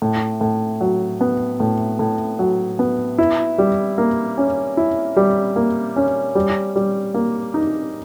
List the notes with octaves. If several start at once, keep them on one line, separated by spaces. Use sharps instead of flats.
A2
A2
F#3
B3
A2
A2
F#3
B3
E4
G3
A#3
C#4
E4
G3
A#3
C#4
G3
G3
A#3
D#4